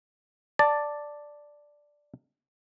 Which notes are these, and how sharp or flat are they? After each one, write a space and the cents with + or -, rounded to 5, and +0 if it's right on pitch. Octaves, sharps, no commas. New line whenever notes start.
D5 +0 A5 +5